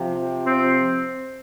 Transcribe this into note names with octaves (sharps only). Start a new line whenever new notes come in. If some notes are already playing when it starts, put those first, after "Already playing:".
Already playing: C3 F3
C4